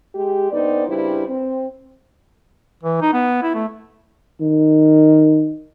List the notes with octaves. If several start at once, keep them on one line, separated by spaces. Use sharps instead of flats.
G#3 G4
D3 B3 C4 D#4 D5
C#3 G3 C4 D4 E4 B4
C4
E3
D#4
B3
E4
A3
D#3